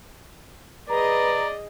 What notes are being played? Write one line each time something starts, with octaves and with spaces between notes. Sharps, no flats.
G#4 B4 D5 D#5 A#5